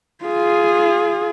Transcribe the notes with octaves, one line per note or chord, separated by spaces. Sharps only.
F4 G#4